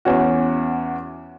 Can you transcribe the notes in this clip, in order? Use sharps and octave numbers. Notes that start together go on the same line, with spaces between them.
E2 C#4 F#4